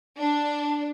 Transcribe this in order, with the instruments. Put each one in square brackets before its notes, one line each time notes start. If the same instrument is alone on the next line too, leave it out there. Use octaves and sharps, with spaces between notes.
[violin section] D4